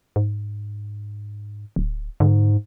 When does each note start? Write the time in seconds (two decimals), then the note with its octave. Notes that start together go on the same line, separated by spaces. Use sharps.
0.16 G#2
1.76 D1
2.20 G#2 D3